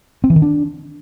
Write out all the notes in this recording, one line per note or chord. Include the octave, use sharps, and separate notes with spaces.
C4
E3
D#3
D4